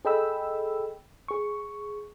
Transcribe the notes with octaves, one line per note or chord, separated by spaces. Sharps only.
G#4 A4 D#5 G5 B5 E6
G#4 C#6